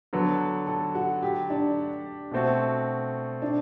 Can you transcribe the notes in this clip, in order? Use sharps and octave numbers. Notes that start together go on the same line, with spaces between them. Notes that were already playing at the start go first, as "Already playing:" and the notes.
D3 F#3 B3 A4
A4
F#4
G4
D4
B2 A3 C4 F#4
D4